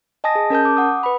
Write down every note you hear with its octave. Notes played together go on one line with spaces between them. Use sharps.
D#5 G#5 A5 D#6 A#6
G#4
C#4 A#4 A5 G6
D6
F#5 D#6
B4 B5